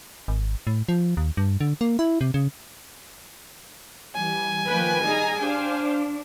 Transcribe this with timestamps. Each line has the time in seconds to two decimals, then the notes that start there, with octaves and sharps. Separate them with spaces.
0.28 G#1
0.67 A2
0.89 F3
1.17 D#2
1.37 G2
1.61 D3
1.81 A#3
1.99 E4
2.21 C3
2.34 C#3
4.15 E3 G3 G#5
4.69 D#3 F3 A#3 B4 G5
5.04 G3 D#4 G#4 A#5
5.39 D4 C5 F5 G5